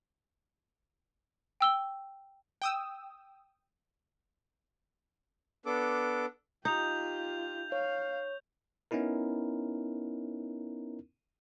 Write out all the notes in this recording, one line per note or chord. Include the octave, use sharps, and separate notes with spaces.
G5 E6 G7
G5 D#6 E6
B3 D4 A4 D6
D#4 F4 G4 G6 F7
C#5 F5
B3 C#4 D#4 E4 A#4